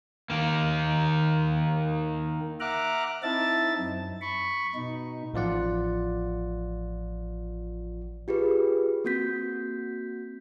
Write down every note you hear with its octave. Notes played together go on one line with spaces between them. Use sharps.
D#3 A#3
E5 F#5 A#5 D6 F6 F#6
C4 D#4 E4 E5 A5 A6
F#2
B5 C#6
B2 D#4
A1 F3 F4 D5 F#5
F4 G4 G#4 B4
A#3 C4 F#4 G6 B6